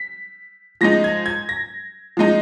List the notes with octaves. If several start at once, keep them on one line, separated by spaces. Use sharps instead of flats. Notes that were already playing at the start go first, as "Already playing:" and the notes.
Already playing: B6
F3 G#3 D#4 A#6
G#6
G#6
A#6
F3 G#3 D#4